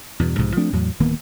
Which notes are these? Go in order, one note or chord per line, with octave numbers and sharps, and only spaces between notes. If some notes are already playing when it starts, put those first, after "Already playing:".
E2 G2 B2
B1 G#2 C3 F3
F3 A3 C4 D4
E2 A2 F#3
D1 D#3 A#3 B3